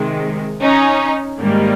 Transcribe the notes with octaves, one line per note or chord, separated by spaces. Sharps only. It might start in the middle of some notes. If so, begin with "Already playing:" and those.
Already playing: C3 D#3 G#3
C#4 D#4
G#2 D#3 G3 A#3